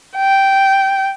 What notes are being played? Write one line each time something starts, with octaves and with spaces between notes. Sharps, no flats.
G5